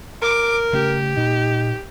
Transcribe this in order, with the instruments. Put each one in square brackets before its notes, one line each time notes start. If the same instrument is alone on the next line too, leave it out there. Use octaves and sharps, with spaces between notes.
[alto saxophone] A#4 [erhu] D6
[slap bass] C#3 A3 C#4 [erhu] G4
[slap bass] A#2 [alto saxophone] D#4